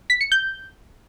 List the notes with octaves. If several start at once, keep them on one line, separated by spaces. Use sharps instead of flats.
B6
C#7
G6